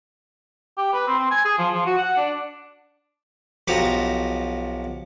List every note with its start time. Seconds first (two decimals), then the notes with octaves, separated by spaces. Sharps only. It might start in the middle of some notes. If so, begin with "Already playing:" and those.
0.77 G4
0.94 B4
1.07 C4
1.19 C4
1.31 G#5
1.45 G#4
1.58 F3
1.73 F3
1.85 F#4
1.98 F#5
2.17 D4
3.68 B1 F3 F#4 G4 A5 A#5